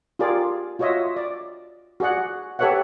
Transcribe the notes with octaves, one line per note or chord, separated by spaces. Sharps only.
F4 G4 G#4 A#4 D5
F4 F#4 C#5 D#5 E5
D5
F#4 G#4 D5 F#5
G4 A4 B4 C#5 E5 F#5